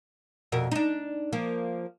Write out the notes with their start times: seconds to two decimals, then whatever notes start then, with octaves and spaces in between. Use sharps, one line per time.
0.52 F2 B2 A#4
0.72 D4 D#4
1.33 F3 A#3